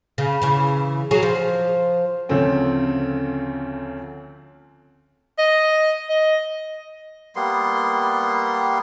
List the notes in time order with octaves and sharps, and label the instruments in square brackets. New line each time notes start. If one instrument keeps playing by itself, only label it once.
[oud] C#3
C#3 E3
F#3 G#4
F3
[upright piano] D2 C#3 F3 A3 C4 C#4
[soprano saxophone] D#5
D#5
[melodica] G3 A#3 B3 C6